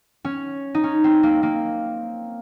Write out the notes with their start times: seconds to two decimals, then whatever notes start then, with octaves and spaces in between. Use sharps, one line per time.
0.25 C#4
0.75 D#4
0.84 C#4
1.04 C4
1.23 A#3
1.43 A#3